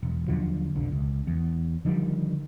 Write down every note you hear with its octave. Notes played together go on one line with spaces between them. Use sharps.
E1
D#2 D3 F3 F#3
F1 B1 D3
C#2
E2
D3 D#3 F3 G3